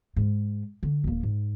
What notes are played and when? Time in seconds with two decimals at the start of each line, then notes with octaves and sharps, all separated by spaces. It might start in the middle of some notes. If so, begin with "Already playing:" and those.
0.16 G#2
0.83 D3
1.04 D#1 A#3
1.23 G#2